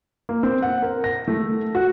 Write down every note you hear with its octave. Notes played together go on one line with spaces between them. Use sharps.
A#3
C4
F#5
A#4
A#6
A3
F#4